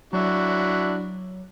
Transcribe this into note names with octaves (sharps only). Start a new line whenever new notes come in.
F#3 D4 E4 F#4